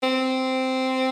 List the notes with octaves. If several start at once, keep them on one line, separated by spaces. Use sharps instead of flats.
C4